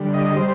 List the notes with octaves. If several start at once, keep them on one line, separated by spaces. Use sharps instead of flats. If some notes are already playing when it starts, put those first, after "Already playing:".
Already playing: D3 G3
D#5
G3 C5